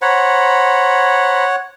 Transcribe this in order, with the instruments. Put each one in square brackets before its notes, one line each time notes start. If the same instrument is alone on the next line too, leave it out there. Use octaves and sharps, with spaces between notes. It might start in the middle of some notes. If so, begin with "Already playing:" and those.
[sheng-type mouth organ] C5 A#5 B5 [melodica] C#5 F#5